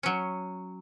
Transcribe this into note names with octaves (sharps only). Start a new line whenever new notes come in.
F#3 C#4